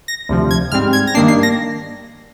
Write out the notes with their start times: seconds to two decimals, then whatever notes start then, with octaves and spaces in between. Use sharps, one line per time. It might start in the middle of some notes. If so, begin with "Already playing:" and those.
0.08 A#6
0.29 D2 C3 F3
0.51 G#6
0.72 G#2 G3 C4 F6
0.93 G#6
1.07 A#6
1.15 G2 D#3 A#3 D4 C7
1.28 C7
1.43 A#6